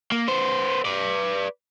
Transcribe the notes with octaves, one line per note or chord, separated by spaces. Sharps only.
A#3
B3 C5
B4 D5